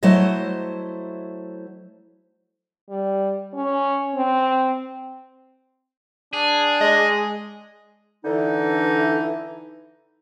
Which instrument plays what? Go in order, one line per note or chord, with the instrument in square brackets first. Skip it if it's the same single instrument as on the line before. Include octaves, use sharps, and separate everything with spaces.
[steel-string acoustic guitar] F#3 A3 E4 C5 D#5
[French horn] G3
C#4
C4
[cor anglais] D4 [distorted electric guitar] G#4
[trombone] G#3 [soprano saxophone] D#5
[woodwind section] D3 E3 D#4